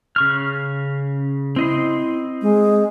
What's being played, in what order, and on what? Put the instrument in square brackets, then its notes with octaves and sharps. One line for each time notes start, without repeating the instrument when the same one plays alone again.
[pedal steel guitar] C#3 C#6 F6
[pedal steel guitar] C4 D#5 C6 [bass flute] E4
[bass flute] G#3